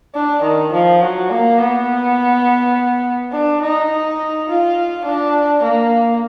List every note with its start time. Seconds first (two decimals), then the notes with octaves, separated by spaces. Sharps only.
0.15 D4
0.43 D#3
0.72 F3
1.02 F#3
1.30 A#3
1.58 B3
3.32 D4
3.62 D#4
3.90 D#4
4.48 F4
5.05 D4
5.63 A#3